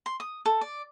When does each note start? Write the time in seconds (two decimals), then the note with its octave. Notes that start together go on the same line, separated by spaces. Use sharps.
0.06 C6
0.20 D#6
0.46 A4
0.61 D5